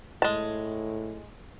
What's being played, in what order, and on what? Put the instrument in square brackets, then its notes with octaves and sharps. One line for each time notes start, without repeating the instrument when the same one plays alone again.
[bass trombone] A2 [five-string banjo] G#3 A5